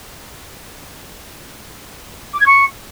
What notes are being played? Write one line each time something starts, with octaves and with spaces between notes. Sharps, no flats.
D6
G#6
C#6